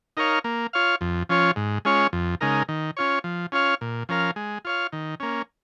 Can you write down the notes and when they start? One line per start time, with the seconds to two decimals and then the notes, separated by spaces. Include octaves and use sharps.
0.17 D#4 A#4 C#5 F5
0.44 A#3
0.73 F4 C#5 F5
1.01 F2
1.29 F3 C#4 F4 C#5
1.56 G#2
1.85 G#3 C#4 F4 C#5
2.13 F2
2.41 C#3 G#3 D#4 A#4
2.69 D#3
2.97 C#4 F4 C#5
3.24 F3
3.52 C#4 F4 C#5 F5
3.81 A#2
4.09 F3 C#4 A#4 F5
4.36 G#3
4.65 F4 C#5 F5
4.93 D#3
5.20 A#3 C#4